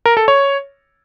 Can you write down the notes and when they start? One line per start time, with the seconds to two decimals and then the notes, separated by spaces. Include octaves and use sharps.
0.06 A#4
0.17 A4
0.28 C#5